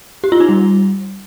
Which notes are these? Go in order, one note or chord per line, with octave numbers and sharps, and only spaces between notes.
G4
F4
D#4
G3